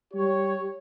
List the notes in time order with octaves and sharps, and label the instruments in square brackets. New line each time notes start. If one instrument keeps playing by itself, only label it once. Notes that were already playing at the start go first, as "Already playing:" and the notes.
[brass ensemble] G3 G4 C#5